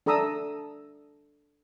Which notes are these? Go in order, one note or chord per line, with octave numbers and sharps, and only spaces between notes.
D4 A4 A#5 D#6 E6